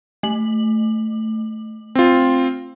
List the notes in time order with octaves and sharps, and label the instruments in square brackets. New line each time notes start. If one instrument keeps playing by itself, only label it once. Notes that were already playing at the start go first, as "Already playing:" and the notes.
[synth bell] A3 F#7
[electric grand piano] C4 F4